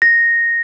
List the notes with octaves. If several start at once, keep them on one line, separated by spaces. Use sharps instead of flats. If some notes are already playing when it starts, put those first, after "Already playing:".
A#6